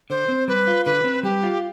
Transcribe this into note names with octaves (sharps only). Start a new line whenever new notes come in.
D3 C5
C4
G3 B4
F4
D3 B4
C4
G3 G4
F4